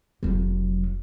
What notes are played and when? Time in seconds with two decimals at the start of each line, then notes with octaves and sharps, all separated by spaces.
0.23 F1 F#3